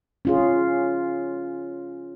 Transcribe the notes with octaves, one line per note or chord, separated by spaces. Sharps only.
C#4 F4 G#4